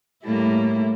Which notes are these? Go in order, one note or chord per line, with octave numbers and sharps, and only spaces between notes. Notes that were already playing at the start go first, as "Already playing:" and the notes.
A2 G3 A3 A#3 E4